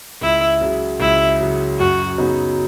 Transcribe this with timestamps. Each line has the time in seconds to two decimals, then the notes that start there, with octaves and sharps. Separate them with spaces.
0.21 C#2 E4
0.61 C#3 F#3
1.00 C#2 E4
1.40 C#3 F#3
1.79 F#2 F#4
2.18 C#3 F#3 B3 D#4